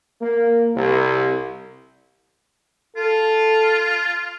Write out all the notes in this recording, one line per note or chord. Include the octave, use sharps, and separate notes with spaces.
A#3
C2
F4 A4